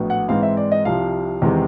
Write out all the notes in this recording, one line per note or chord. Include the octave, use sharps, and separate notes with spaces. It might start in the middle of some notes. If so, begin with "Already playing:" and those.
Already playing: A#1 A2 F#3 B3
F#5
G#2 E3 G#3 C4 F5
E5
D5
D#5
C2 C3 F3 F5
E2 C3 D#3 G#3 C4